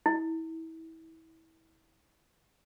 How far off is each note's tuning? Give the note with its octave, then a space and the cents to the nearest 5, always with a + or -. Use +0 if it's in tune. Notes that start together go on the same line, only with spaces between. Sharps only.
E4 -30